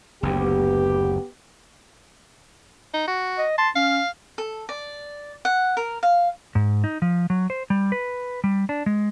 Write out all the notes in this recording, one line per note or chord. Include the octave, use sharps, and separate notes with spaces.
F#1 D2 B3 G4
D#4
F#4
D#5
A5 C6
C#4 F5
A4
D5
F#5
A#4
F5
G#2
D#4
F3
F#3
C5
G3
B4
G3
D4
G#3